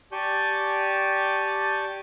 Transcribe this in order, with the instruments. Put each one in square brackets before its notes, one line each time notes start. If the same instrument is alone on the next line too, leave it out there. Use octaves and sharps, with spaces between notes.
[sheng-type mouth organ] G4 D5 G#5 A5 C#6 G6